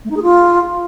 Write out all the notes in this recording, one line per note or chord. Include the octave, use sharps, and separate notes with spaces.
A3
D#4
G#4
F4